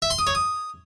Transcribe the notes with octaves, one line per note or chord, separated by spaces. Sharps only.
E5
C6
D#6
C#5
D#6